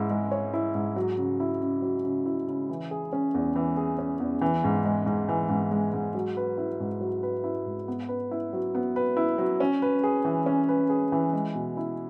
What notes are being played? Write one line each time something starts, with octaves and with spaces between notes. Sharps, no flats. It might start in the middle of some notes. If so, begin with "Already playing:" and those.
Already playing: G#2 E4
G#3
C#5
E4
G#2
F#3
C#3
E4
C#3
F#3
C#3
E4
C#3
E3
G#4
C#4
E2
E3
G#4
C#4
E2
E3
G#2
G#3
G#2
E3
G#2
G#3
G#2
F#3
B4
E4
G#2
F#3
B4
E4
G#2
B3
B4
E4
F#3
B3
B4
E4
F#3
C#4
B4
G#4
E3
C#4
B4
G#4
E3
G#3
B2
E4